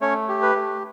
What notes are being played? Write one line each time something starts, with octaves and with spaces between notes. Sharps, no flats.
A3 C#4 C#5
G4
B4
A3